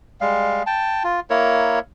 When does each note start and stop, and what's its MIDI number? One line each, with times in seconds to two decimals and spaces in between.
0.21 0.63 55
0.21 0.63 56
0.21 0.63 77
0.66 1.03 79
0.66 1.03 81
1.04 1.20 65
1.30 1.79 58
1.30 1.79 64
1.30 1.79 70
1.30 1.79 73